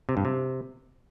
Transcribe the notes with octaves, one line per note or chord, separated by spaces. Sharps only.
C3
G2
C3